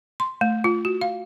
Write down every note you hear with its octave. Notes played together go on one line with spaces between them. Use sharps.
C6
A3
F4
F#4
F5